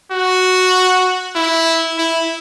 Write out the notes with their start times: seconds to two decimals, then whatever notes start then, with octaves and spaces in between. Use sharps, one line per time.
0.12 F#4
1.35 E4
1.98 E4